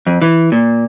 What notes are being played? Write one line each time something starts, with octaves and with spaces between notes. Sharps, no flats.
F2
E3
A#2